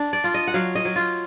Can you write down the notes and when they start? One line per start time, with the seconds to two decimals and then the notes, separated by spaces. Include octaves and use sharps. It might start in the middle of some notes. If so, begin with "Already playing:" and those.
Already playing: D4
0.13 D5
0.24 F4
0.34 D#5
0.47 F#5
0.54 F#3 F5
0.75 D#5
0.85 F#3
0.96 F4